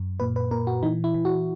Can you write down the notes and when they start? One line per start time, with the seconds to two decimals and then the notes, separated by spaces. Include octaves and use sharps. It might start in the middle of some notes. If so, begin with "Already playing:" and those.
Already playing: F#2
0.20 A#2 B4
0.36 B4
0.51 A#2 A#4
0.67 F#4
0.83 E3 D#4
1.04 E4
1.14 E3
1.25 F#4